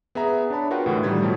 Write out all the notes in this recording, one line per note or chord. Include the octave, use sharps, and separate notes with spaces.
B3 G#4 E5 A#5
D4 C#5 A5 B5
F4 F#4 A#4 B4 F#5 G5
A2 D3 E3
A2 D#3 G3 G#6
B2 F3 F#3